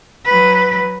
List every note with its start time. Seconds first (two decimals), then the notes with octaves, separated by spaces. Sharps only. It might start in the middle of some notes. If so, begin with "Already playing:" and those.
0.25 F#3 B4